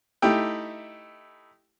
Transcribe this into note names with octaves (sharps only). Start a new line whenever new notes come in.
A3 D#4 E4 G4 G5